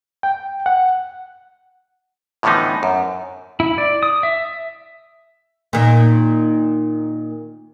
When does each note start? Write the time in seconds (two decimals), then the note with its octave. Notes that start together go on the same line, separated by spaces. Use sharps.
0.23 G5
0.66 F#5
2.43 A2 D3 E3 F3 B3 D#4
2.83 F#2
3.60 E4
3.78 D5
4.03 D#6
4.23 E5
5.73 A#2 D#3